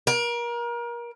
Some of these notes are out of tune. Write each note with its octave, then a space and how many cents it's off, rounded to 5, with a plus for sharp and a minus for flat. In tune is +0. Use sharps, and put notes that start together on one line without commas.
A#4 +30